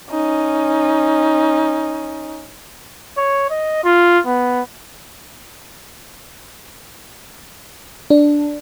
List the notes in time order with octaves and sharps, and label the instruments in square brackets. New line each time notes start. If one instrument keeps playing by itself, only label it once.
[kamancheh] C#4 D#4
[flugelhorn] C#5
D#5
F4
B3
[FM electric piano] D4